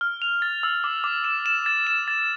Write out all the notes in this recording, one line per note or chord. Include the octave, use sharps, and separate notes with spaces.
F6
F7
A6
E6
D6
D6
E7
E7
A6
E7
A6